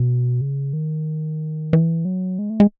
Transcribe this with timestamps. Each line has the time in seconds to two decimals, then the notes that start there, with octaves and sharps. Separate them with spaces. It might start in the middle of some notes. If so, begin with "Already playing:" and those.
Already playing: B2
0.41 C#3
0.73 D#3
1.73 E3
2.05 F#3
2.39 G#3
2.50 A3
2.60 G#3